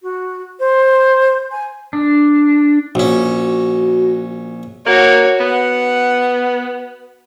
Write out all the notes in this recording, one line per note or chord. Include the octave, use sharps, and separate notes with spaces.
F#4
C5
G#5
D4
A#1 C#4 F#4
A#3 F#4 C#5
B3 F#5